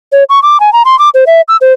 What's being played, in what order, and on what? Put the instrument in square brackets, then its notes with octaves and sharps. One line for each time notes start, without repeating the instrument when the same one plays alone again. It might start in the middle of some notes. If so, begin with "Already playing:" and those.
[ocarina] C#5
C#6
D6
G#5
A#5
C6
D6
C5
E5
E6
C5